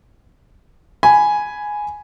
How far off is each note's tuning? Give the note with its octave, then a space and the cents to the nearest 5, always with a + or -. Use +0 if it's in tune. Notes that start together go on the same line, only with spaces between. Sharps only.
G#5 +5 B5 +0